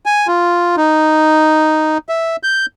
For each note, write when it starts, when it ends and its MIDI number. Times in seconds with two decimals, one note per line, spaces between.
0.06 0.27 80
0.27 0.76 65
0.77 1.98 63
2.09 2.36 76
2.43 2.66 91